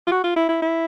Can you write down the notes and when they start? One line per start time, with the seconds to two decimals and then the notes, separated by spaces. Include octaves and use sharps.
0.07 F4
0.12 F#4
0.24 F4
0.36 E4
0.49 E4
0.62 E4